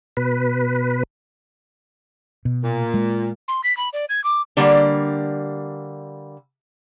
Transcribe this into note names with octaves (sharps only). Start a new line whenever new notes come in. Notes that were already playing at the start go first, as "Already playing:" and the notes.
B2 B4
B2
A#2
G#3
C6
B6
B5
D5
G#6
D6
D3 G3 A#3